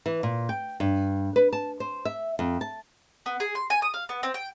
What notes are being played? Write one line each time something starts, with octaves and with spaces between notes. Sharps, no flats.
E3
A#2
G5
G2
B4
A5
C5
E5
F2
A5
B3
G#4
C6
G#5
D#6
F5
B3
C4
G5